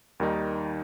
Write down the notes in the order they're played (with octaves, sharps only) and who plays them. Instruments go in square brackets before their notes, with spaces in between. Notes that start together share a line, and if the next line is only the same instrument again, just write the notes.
[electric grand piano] D#2 D#3 G3 D#4